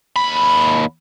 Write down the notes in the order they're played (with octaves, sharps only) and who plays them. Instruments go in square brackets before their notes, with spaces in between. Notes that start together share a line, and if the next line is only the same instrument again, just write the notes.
[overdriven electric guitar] D#2 B5